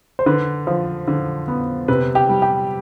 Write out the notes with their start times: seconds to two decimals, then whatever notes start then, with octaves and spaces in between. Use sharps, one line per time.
0.19 C5
0.26 D3 B4
0.67 F3
1.08 D3
1.48 B3
1.88 C3 B4
2.15 G4
2.29 G3
2.42 G4